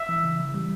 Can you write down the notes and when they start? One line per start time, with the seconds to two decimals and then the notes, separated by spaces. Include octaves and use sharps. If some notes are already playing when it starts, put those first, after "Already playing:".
Already playing: E5
0.09 E3
0.24 C#3
0.40 E3
0.54 G3